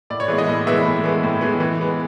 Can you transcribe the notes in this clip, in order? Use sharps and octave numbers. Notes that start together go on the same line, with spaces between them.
A2 D5
C#5
E3 G#3 B3 B4
D#5
A2
E3 G#3 B3 E5
A2
E3 G#3 B3
A2
E3 G#3 B3
E3
G#3 B3